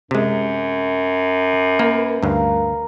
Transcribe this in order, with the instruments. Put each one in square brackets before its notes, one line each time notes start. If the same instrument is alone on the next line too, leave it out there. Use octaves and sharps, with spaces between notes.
[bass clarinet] F#2 [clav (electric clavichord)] C3 G#3
[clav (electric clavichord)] A#3 [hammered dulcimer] B4
[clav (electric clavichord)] D2 G2 [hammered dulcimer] A#4 F5